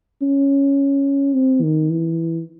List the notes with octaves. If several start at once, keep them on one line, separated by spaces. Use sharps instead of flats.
C#4
C4
D#3
E3